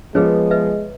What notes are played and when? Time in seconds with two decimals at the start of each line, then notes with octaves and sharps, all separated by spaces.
0.15 F3 G#3 B3 G#4 B4 C#5
0.51 B4 D#5 E5